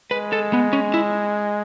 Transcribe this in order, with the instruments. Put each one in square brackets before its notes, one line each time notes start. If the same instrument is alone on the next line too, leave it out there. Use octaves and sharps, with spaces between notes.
[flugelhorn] G#3 [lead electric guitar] B4
[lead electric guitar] A4
B3
C#4
E4